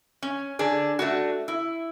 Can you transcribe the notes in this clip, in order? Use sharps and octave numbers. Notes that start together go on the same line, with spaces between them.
C#4
D3 D4 G#4
A3 D4 F#4
E4